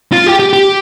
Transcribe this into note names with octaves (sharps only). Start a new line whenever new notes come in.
F4
G4
G4
G4